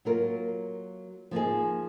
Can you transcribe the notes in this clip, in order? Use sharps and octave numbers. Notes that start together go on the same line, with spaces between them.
F#3 A#3 F4 A#4
F3 A#3 D#4 G#4